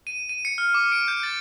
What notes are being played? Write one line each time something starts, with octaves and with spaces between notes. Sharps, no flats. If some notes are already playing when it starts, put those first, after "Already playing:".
D#7
D#7
C#7
F6
D6
D7
G6
A6